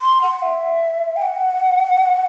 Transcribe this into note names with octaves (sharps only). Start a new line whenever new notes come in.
C6
F#5
E5
G5
F#5